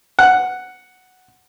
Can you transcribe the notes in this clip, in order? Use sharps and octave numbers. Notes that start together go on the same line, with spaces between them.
F#5